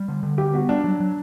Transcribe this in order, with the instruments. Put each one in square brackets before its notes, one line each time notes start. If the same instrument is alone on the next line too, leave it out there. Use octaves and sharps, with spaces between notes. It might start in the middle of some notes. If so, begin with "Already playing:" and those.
Already playing: [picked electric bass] G3
D3
D3
[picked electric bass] G3 [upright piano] G4
[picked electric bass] B3 [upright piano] F#4
[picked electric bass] G3 [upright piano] D4
[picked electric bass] F#3
F#3